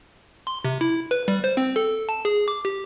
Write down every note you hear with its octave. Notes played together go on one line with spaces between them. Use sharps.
C6
C3
E4
B4
G3
C5
C4
A4
A5
G#4
D6
G4